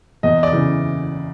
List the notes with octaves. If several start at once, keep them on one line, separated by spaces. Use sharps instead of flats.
E2 D#5
D5
C#3 E3